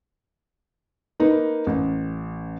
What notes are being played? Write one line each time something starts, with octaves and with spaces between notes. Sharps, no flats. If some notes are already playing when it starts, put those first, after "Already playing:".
A#3 D#4 B4
A1